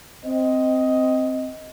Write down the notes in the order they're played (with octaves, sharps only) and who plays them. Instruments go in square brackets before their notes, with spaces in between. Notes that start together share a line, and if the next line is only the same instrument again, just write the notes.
[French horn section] C4 D#5